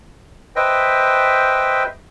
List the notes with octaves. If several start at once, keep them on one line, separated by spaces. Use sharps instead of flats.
B4 C5 D#5 E5 G5